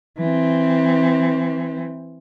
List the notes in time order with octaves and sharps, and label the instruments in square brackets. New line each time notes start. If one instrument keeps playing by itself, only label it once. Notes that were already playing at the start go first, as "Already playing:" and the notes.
[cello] E3 C4